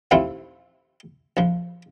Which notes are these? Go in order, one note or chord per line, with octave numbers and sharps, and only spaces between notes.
D#2 A#2 A3 C4 E4 F4
A#1 F3